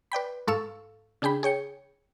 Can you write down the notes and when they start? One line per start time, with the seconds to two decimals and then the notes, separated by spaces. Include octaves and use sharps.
0.12 B4 D5 G5 B5
0.47 G#2 A4 F5 C#6 E6
1.22 C#3 D4 G#4 G5 B5
1.43 G#4 C#5 G5 C#7